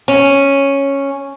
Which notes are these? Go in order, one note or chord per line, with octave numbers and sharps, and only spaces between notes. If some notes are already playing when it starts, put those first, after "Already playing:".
C#4